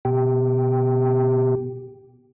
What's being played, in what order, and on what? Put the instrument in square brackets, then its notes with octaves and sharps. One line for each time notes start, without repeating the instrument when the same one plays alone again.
[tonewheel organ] B2 G4